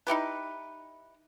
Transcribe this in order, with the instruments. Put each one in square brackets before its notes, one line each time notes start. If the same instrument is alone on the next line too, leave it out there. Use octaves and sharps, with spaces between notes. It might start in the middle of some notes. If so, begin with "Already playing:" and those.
[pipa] D#4 E4 G4 B4